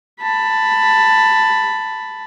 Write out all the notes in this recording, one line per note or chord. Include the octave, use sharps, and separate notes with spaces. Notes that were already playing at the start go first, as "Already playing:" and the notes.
A5 B5